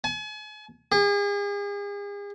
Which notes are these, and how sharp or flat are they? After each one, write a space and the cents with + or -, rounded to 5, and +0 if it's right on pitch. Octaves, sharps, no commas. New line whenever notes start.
G#5 +40
G#4 -40